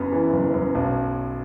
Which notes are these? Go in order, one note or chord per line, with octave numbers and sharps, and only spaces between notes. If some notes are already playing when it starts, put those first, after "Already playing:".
Already playing: F#1 F#2 B3
E3
F#1
F#2
B1